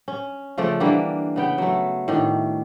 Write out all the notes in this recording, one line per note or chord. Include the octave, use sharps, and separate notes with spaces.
C#4
C#3 F3 A3 D5
D3 E3 G3 A#3
C#3 B3 G5
F#3 A3
A2 D#3 D4